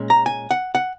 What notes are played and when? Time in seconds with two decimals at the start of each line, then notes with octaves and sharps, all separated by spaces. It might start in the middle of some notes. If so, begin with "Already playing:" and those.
Already playing: A#2 G#3 C#4
0.10 A#5
0.26 G#5
0.51 F#5
0.75 F#5